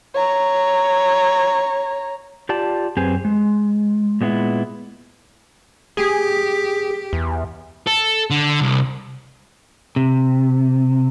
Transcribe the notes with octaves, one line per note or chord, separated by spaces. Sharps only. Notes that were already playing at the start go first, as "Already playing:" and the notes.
C#5 A#5
F4 G4 D5 A5
F#2 C4 G4 G#4 B4 G#5
G#3
A#2 G#3 B3 D#4 E4
G4 G#4
E2
A4
D3
C2
C3